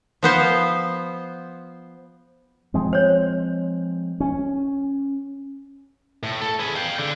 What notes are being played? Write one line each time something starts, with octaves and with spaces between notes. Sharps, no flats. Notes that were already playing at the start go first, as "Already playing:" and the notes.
F3 B3 C5 F5
F3 G#3 C4
C5 C#5
C#4
A2
A4
G#4 B4
F5 G5
D3